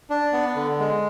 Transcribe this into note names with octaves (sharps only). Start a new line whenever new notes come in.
D4
B3
D3
G#3